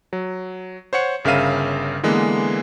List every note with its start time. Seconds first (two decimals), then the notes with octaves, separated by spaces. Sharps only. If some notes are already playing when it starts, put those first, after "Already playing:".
0.13 F#3
0.93 C5 C#5 F#5 C#7
1.25 G1 C#3 A#4 E5 F5 D#7
2.03 D3 E3 G#3 A#3 B3